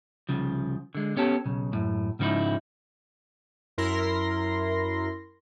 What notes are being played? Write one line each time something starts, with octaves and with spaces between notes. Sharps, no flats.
C2 C#3 F3
D3 G#3
B3 C#4 G4 A4
B1 C#3
F#2 A2
G#2 C#3 F3 D#4 E4
F#2 E4 A#4 C6 A#6